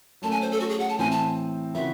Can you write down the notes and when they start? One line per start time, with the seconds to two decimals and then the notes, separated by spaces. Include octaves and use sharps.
0.22 F#3 A3 C#4 A5
0.31 G#5
0.42 C5
0.51 A4
0.60 F#4
0.69 G#4
0.80 F#5
0.89 A5
0.98 A2 E3 C4 G#5
1.11 A5
1.75 C#3 E3 C4 F#4 E5